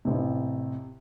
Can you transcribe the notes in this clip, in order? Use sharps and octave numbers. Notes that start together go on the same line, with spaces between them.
A1 C3